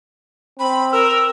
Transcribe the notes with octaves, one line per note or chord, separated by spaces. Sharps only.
C4 B5
A#4 E6